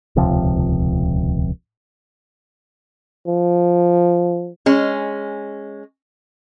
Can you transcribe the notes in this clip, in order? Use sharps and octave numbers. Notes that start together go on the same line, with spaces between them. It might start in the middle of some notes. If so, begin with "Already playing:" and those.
D#1 C#2 C3 F3
F3
G#3 C#4